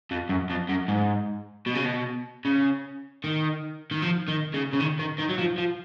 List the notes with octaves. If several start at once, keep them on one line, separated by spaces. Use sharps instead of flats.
F2
F#2
F2
F#2
G#2
B2
C#3
B2
C#3
D#3
D#3
F3
D#3
C#3
C#3
D#3
D#3
D#3
F#3
F3
F3